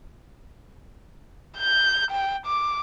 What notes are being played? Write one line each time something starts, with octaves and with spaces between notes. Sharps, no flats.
G6
G5
D6